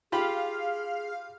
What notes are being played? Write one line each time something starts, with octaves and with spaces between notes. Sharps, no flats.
F4 G4 G#4 F5 B5